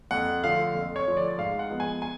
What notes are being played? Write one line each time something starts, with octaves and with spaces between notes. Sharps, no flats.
F2 F#5
D3 F3 A3 F5
F2
C#5
D3 F3 A3
D5
D5
G#2 F5
F#5
F3 G#3 B3
G#5
G#5